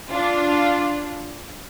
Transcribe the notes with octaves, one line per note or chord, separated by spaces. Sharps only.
D4 F4